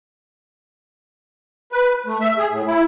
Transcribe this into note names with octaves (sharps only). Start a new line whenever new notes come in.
B4
A3
E5
G#4
A2
E4